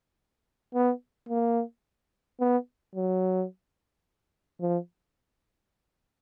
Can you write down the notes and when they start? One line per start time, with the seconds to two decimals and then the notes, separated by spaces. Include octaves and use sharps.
0.74 B3
1.29 A#3
2.40 B3
2.95 F#3
4.61 F3